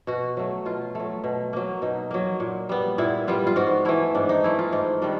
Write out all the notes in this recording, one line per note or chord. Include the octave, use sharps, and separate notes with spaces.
B2 F#4
F#3 A3
B2 F4
F#3 A3
B2
F#3 A#3
B2 D#4
F#3 A#3
A#2
G3 B3
A#2 E4
G3 B3 F4
F4
G#2 F#4
E3 A3 E4
G#2 D4
D#4
E3 A3 E4
F4
G#2 D#4
D#3 G3 D4